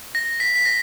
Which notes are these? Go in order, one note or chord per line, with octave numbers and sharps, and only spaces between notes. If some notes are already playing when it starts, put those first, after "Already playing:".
A#6
B6
B6
A#6